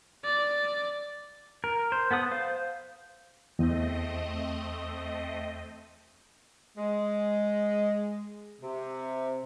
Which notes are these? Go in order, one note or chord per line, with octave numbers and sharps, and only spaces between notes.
D5
A#4
C5
B3 A4 F#5 D#6
C5 F5
E2 A3 C4 D#5
G#3
C3